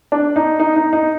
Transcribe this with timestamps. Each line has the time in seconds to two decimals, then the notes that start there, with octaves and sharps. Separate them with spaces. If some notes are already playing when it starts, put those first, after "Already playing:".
0.12 D4
0.36 D#4
0.60 D#4
0.76 D#4
0.93 D#4